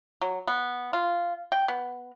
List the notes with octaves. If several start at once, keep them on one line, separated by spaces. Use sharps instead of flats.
F#3
B3
F4
G5
B3